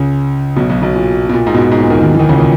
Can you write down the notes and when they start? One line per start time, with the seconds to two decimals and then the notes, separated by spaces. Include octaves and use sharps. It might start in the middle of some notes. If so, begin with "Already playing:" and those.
Already playing: C#2 C#3
0.56 B1 B2
0.69 B1 B2
0.82 B1 B2
0.95 A#2
1.29 B2
1.34 A#2
1.47 G#2
1.54 B2
1.58 A#2
1.72 G#2
1.80 A#2
1.90 D#2 D#3
2.00 D#2 D#3
2.15 E3
2.19 D#2 D#3
2.29 C#2 C#3
2.38 A#2